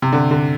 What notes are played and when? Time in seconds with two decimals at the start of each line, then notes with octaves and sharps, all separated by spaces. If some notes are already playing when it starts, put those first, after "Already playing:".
0.02 C3
0.12 D3
0.31 D3